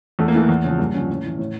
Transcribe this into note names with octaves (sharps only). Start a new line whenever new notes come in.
E2 A3
A#3
E3 A3
E2
C#3 F3
G2 A#3
D3 F3 C#4
A2
E3
A2